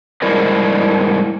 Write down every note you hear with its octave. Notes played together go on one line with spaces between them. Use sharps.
G#2 G3 E4 A#4 D5 D#5